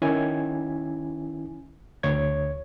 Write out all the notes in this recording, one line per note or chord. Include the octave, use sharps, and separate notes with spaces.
D#3 C#4 E4 G#5 G#6
D2 C#5 G#6